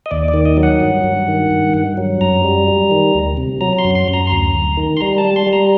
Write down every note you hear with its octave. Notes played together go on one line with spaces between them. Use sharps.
D#5
D#2 D5
D5
D#3
D#5
F#3
F#5
G2
G2
D#3
G2
G2
F#3
F#2 A#5
G3
G3
D#3
D2
C3
F#3 A#5
C6
F#2
C6
F#2
A#5
C6
D2 A#5
D2
D#3
C6
G3 A#5
A5
G3
C6
G3
A#5